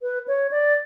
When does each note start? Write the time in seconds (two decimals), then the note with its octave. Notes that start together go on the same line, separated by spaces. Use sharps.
0.01 B4
0.28 C#5
0.51 D5